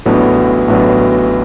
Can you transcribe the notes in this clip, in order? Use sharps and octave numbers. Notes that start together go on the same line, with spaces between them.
A1 A2 F#3 B3 D4
A1 A2 F#3 B3 D4